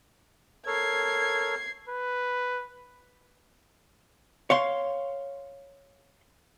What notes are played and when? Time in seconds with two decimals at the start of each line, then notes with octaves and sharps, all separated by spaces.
0.66 A4 A#4 C#5 G#6 C7
1.89 B4
4.50 C#5 F5 C6